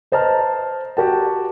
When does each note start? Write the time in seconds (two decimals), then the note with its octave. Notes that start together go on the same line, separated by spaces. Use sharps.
0.12 B4 C5 D#5 A5 A#5 F6
0.97 F#4 G4 A#4 G5 A5